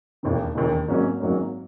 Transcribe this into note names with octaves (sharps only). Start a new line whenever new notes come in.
E1 D#2 D#3
E1 D#2 D#3
G#1 G#2 F#3 A#3 C#4
G#1 G#2 F#3 A#3 C#4